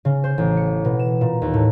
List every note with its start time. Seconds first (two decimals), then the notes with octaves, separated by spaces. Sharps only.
0.05 C#3
0.24 C5
0.38 A1
0.57 C#7
0.85 B2
0.99 E7
1.21 A#2
1.42 D#2
1.54 A2